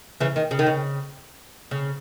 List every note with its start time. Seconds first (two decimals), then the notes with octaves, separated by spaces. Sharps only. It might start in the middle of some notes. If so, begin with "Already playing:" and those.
0.20 C#3 E3
0.36 D#3
0.51 C#3
0.59 D#3
0.66 C#3
1.71 C#3